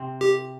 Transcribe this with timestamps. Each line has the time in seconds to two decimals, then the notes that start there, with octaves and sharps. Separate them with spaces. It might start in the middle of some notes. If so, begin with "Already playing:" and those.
Already playing: C3 C4
0.21 G4